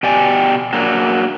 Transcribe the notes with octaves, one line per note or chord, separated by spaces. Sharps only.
B2 G4 D5 G5 G#5
F#3 A#3 D4